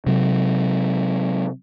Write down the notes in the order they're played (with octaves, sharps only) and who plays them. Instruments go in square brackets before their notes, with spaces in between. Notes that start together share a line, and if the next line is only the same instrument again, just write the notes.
[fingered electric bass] C3 F#3